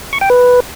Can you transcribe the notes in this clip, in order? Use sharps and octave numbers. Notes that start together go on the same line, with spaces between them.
C#6
G5
B4